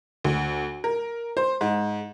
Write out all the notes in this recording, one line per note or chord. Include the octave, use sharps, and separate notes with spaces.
D2
A#4
C5
G#2